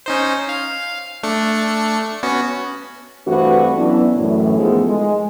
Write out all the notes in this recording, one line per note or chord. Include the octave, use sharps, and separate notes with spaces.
C#4 D#4 C5
F5
A3 D4 C#7
B3 C#4 F#4
G2 E3 A3 C4 F#4 B4
E3 F#3 B3 C#4 D4 E4
F#2 A2 E3
D#3 F3 G#3 A3 B3 A4
G#3